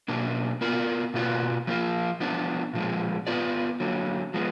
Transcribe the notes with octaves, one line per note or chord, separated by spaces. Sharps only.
B2 A#3 D4
B3 F4 A#4 D5
B2 A#3 F4 B4 D5
F3 A#3 F4
F3 B3 D4
A#2 F3 G#3
B3 F4 B4 D5
D3 F#3 A#3
F3 G#3 B3